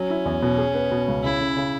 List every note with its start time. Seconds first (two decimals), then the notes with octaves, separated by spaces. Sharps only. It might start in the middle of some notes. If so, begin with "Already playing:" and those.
Already playing: F#3 C#4
0.10 E4
0.25 E2
0.42 B2
0.58 G#4
0.75 B3
0.92 B2
1.08 C#2
1.24 C#3 E4
1.41 C#3
1.57 C#3